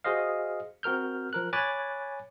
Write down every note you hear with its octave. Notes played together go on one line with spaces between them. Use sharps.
F#4 G#4 C5 D#5 F5
C4 F#4 A#4 F6 G6
F3 A#4 F#6
C#5 G#5 B5 D6 F#6 A6